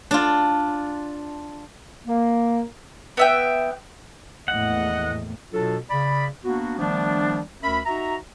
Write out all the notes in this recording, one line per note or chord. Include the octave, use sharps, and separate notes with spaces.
D4 F4
A#3
B3 E5 G5
A#1 E2 A2 D#5 F#5
B2 F#3 D4 F4 F#4 A4
C#3 D5 B5
A#3 B3 D4 F#4
D#3 F3 G3 A3 B3 D4
D2 C#4 A#4 E5 B5
D#4 F#4 E5 A#5